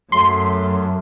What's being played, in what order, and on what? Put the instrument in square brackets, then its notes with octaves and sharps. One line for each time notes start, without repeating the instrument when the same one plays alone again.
[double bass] F#2 [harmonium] F#3 A3 [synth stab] C6